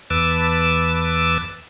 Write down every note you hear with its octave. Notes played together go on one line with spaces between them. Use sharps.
E2 B4 A5 D6 E6